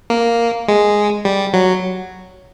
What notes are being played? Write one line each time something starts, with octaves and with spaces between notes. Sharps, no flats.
A#3
G#3
G3
F#3